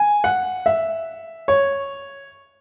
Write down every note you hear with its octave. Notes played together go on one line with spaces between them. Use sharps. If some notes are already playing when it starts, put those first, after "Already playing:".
Already playing: G#5
F#5
E5
C#5